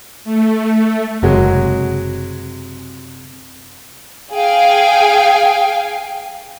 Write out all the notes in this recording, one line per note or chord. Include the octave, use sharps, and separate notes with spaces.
A3
F#1 C3 F#3 G#3
G#4 F5 G5 G#5